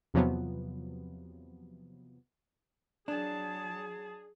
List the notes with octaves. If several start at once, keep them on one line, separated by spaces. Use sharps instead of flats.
E2 C3 F3 F#3 B3
F#3 D4 G#4 A5